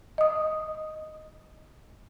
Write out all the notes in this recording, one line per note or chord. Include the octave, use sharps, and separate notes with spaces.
D#5 D#6